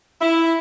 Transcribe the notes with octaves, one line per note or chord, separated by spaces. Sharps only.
E4